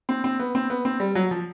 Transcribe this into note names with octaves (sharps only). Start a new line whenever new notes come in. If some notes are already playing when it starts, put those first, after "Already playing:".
C4
C4
B3
C4
B3
C4
G3
F#3
F3